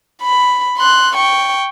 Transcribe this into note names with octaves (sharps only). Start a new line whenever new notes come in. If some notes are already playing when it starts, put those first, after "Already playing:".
B5
C6 F#6
G5 C#6